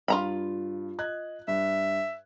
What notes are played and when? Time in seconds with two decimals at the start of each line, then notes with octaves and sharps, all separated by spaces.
0.08 G2 F4 A#5 B5
0.99 D#5 F#6 G#6
1.48 G2 E5